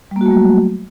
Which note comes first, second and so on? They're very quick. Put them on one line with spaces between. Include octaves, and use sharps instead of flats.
G3 A#3 F#4 A3 F#3